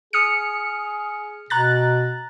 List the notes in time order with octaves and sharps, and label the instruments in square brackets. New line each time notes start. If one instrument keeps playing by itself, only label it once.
[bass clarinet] G#4 [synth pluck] D#6 F6 C#7
[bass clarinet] B2 [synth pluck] A#5 F#6 A6